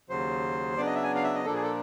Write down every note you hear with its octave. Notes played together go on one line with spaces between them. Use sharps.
D#2 C#3 F#3 C5
C#3 F#3 B3 D4 D5
D#5
E5
G#5
F5
E5
D#5
A#2 F3 A#3 D4 A4
G#4
A4